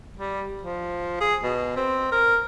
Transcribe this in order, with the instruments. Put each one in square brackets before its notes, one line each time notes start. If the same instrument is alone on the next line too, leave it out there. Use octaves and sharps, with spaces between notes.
[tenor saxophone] G3
F3
G#4
B2
C4
A#4